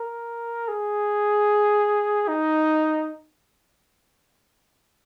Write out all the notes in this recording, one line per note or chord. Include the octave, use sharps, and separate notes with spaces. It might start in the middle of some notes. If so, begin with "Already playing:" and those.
Already playing: A#4
G#4
D#4